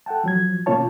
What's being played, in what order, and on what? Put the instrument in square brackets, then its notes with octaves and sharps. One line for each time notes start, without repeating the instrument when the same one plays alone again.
[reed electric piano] A4 F#5 G5 A5
F3 F#3 G#6
B2 A#3 C#4 F4 C#5 A5